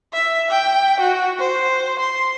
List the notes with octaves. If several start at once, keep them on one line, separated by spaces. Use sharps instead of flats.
E5
G5
F#4
C5
C6